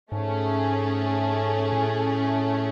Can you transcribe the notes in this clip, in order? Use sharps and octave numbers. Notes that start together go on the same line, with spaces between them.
G#2 A3 C#4 G#4
A2